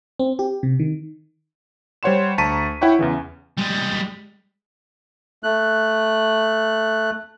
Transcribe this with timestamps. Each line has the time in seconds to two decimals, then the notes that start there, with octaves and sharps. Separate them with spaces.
0.19 C4
0.39 G4
0.63 C3
0.79 D#3
2.03 G3 C5 C#5 F#5 C6 E7
2.38 D2 A5 A#5 C#6 B6 D#7
2.81 E4 C#5 F#5 G5 C#6
2.99 E2 C#3 E3
3.58 G3 G#3
5.43 A3 F#6